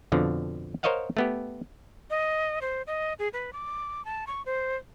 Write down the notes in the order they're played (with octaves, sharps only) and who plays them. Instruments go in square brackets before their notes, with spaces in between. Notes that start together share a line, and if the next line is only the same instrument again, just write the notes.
[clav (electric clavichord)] F2 B2 D3 F3
A#4 C5 C#5 D#5 F5 F#5
A3 B3 G4
[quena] D#5
C5
D#5
G#4
B4
D6
A5
C#6
C5